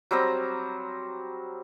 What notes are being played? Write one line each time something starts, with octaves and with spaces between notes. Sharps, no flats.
F#3 G3 C4 A#5